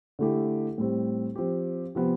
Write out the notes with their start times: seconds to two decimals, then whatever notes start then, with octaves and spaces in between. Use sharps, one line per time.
0.19 D3 A3 E4 G4
0.78 A2 G3 C4
1.36 F3 C4 G4
1.95 C3 F3 B3